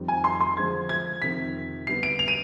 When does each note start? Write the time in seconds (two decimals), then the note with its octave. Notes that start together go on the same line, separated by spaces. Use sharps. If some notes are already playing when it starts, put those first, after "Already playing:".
Already playing: F2 D#3 G3 C4
0.08 G#5
0.24 C6
0.41 C6
0.56 D3 F3 G#3 D4 G#6
0.89 G#6
1.21 F2 C3 D#3 B6
1.87 D3 G3 B3 C7
2.03 D7
2.19 F7
2.28 D#7